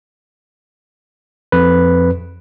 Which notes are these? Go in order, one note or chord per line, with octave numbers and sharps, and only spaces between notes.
F2 B4